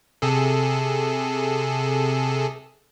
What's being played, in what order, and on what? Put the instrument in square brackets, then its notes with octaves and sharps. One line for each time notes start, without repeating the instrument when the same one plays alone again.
[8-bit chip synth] C3 G#4 A4